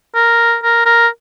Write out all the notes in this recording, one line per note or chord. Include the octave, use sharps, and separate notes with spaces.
A#4
A#4
A#4